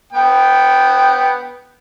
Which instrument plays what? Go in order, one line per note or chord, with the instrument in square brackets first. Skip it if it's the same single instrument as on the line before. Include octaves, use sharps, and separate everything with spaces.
[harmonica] B3 G5